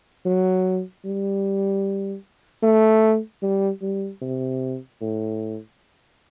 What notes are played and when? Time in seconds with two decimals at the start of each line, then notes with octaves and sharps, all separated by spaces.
0.25 F#3
1.05 G3
2.63 A3
3.42 G3
3.82 G3
4.22 C3
5.01 A2